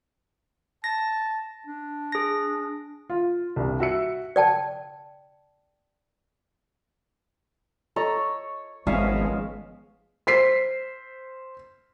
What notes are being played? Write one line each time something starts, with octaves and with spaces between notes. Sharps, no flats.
A5 A#6
D4
G#4 A#6
F4
C2 G2
F#4 E5 E6 C#7
D5 G5 A5
A4 C#5 D#5 A#5
G#1 F3 G#3 B3 C#4 E5 F5
C5 B6 C7